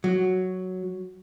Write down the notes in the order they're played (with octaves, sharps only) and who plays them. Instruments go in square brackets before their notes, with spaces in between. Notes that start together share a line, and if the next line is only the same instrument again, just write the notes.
[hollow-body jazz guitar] F#3